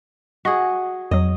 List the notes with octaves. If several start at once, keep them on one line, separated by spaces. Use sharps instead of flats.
F#4 G#4 D#5
F2 F#3 D#5